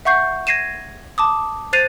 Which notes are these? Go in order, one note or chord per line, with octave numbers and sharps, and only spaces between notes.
E5 F#5 C#6 G6 C7
G#6 A#6 C7 D#7 E7
A5 D6 D#6
C5 F#6 A6 C7 D#7 F7